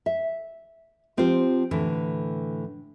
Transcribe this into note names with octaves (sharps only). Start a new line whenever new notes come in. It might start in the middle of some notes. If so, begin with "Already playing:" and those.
E5
F3 C4 F4 G4 C5
A2 D3 E3